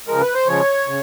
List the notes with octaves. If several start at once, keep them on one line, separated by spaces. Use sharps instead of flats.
C#3 F3 G#3 A#4
B4
C5
C#3 F3 G#3 C#5
C#3